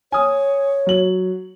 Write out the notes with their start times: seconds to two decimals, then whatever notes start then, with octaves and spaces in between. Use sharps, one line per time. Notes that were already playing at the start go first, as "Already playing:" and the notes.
0.12 C#5 G#5 D#6
0.87 F#3 F#7